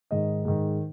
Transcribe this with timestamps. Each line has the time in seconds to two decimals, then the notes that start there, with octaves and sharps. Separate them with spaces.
0.11 G#2 D#3 D#5
0.45 G#2 D#3